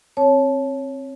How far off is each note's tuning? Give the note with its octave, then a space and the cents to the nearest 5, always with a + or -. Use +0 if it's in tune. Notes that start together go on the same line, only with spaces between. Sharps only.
C4 +20 C#5 +0 A5 -20